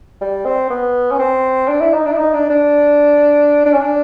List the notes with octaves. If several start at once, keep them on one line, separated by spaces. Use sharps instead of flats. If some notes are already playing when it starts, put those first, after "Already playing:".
G3
C4
B3
C#4
C4
D4
E4
D#4
D4
E4
D#4
D4
D4
D4
C#4
D4